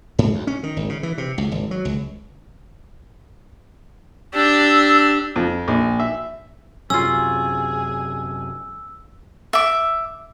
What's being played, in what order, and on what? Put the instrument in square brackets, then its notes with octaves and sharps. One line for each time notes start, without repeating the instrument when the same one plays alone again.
[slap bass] G#2
D2
C#4
D#3
G#1
C#3
E3
C3
C#2
G#1
F#3
C#2
[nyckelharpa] D4 G4 [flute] E6
[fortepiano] F2
A#1
E5
[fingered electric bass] F#2 C3 [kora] C#4 F4 [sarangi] G#4 [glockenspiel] E6
[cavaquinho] E5 D6